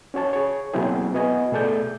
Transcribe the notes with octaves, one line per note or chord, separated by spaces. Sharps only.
C#4 F#4 C#5 A5
G#4 C#5
B2 F#3 A#3 C4 E4 G#4
B3 F#4 D#5 G#5
B2 A3 G#4 A4 D5 G6